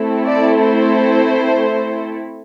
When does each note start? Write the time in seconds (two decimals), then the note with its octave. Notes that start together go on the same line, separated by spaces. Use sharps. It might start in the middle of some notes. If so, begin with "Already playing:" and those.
Already playing: A3 C4 E4 A4
0.26 D5
0.57 C5